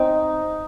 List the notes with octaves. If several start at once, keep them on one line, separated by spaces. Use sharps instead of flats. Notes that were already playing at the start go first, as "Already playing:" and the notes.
Already playing: C4 D#4